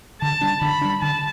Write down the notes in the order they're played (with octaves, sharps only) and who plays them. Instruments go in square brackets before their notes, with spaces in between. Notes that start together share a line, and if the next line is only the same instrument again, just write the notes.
[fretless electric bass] D3 [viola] A5
[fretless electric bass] G3 D4
[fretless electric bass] D3 [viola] B5
[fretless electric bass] G3 D4
[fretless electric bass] D3 [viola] A5